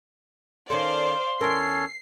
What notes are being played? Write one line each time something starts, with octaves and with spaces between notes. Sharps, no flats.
D#3 C#4 A4 C5 D5 F5 C6
E2 C#4 A4 A#4 C7